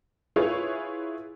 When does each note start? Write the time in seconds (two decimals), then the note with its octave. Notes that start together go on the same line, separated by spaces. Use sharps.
0.36 E4 F4 G#4 B4 C#5